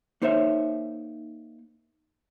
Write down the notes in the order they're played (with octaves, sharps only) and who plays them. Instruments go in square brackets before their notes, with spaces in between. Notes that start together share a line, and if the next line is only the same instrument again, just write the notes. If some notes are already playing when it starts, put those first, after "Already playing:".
[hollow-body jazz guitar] A#3 D#4 C5 C#5 E5